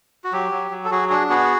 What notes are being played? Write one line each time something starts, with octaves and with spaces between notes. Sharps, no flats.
F#4
F#3 G4
F#3
F#3
A4
F#3 F#4 G#4
D4 F#4 G#4
B3 F#4 G#4